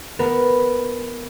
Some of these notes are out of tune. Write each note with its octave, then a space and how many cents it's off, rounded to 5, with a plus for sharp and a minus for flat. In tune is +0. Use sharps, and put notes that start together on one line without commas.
B3 +0 A#4 +0